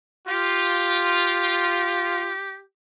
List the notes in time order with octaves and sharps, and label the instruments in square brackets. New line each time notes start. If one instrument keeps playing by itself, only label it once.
[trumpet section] F4 [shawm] G4